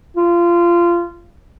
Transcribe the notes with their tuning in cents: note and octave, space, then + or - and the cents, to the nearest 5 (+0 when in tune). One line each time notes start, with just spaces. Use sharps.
F4 -20